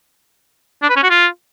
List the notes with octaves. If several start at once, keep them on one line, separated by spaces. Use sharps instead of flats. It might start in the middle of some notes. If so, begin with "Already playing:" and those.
D4
B4
C#4
F#4
F4